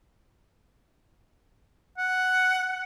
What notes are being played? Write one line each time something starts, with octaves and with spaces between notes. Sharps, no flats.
F#5